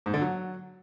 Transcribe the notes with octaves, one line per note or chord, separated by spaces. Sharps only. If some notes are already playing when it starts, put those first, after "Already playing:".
G#2
D3
F#3